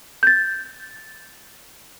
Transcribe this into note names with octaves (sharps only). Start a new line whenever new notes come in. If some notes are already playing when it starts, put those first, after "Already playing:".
G6 A6